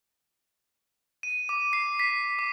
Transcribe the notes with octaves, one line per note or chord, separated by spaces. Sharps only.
D#7
D6
C7
B6
D6